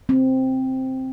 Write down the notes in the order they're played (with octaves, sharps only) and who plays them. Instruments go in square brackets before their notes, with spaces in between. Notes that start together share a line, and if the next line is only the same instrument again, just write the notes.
[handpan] C4